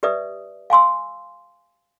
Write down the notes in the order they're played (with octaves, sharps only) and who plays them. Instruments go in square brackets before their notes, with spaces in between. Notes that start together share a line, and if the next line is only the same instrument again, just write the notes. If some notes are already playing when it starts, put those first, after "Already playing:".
[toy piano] G4 B4 D5 E5 D#6
F5 G#5 C6 E6